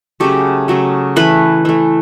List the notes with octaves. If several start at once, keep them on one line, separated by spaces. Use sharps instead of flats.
C#3 F#3 A3 G4
C#3 F#3 A3
E3 A3 B4
E3 A3